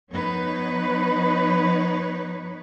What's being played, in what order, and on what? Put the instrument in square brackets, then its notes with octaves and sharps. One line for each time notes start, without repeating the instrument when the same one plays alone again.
[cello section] F3 B3 D#4 B4 C#5